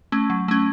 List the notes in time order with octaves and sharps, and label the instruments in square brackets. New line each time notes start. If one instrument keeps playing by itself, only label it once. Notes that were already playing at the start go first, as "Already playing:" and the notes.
[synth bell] A3 C#4
F#3
A3 C#4